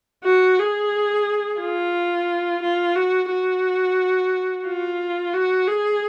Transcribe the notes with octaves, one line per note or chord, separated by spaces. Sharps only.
F#4
G#4
F4
F4
F#4
F#4
F4
F#4
G#4